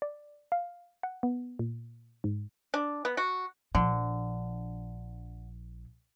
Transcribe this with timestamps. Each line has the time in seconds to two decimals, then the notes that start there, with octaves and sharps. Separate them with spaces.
0.02 D5
0.52 F5
1.03 F#5
1.23 B3
1.59 A#2
2.24 G#2
2.74 D4
3.05 B3
3.17 F#4
3.75 A#1 D3 F3